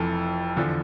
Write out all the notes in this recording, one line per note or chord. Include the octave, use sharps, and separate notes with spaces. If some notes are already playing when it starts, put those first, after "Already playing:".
Already playing: F1 F2 E3 A4
E2 D3 F3